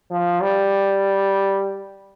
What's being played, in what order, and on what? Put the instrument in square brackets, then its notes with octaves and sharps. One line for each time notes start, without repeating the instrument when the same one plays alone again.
[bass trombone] F3
G3